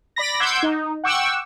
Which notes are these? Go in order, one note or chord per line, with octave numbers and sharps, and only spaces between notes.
D5 B5 A#6
F#5 C6 D6 E6 G6 G#6
D#4
F#5 G5 C#6 D6 E6